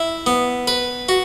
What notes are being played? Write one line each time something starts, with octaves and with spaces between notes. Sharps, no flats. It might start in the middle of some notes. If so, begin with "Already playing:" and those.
Already playing: E4
B3
B4
F#4